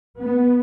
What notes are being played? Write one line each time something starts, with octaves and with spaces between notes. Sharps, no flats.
B3